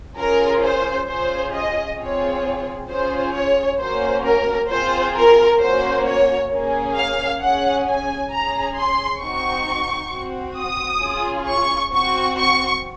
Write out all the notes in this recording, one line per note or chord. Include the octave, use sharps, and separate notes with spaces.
C#4 F4 G#4 A#4
C5
C#4 F4 G#4 C5
D#5
C4 F4 G#4 C#5
C#4 F4 G#4 C5
C#5
A#3 C#4 F#4 C5
A#4
C4 F4 G#4 C5
A#4
A#3 C#4 F#4 C5
C#5
A#3 C#4 G#4
F5
C#4 G#4 F#5
G#5
C#4 G#4 A#5
C6
C4 D#4 F#4 C#6
C4 F#4
D#6
C#4 F4 G#4
C#6
C4 F#4 C#6
C#6